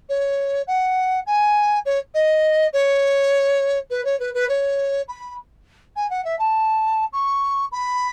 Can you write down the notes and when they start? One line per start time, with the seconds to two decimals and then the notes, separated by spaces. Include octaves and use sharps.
0.09 C#5
0.67 F#5
1.26 G#5
1.85 C#5
2.14 D#5
2.73 C#5
3.90 B4
4.04 C#5
4.19 B4
4.34 B4
4.49 C#5
5.08 B5
5.96 G#5
6.10 F#5
6.24 E5
6.39 A5
7.12 C#6
7.72 B5